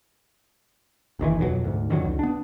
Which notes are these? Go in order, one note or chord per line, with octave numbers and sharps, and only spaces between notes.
F#1 D#2 D#3 E3
F2 B2 D#3 F#3
D2 G#2
F2 D3 D#3 F#3
C#2
B3 D4